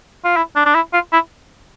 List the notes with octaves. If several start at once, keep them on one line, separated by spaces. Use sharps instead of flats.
F4
E4
D4
D4
E4
F4
E4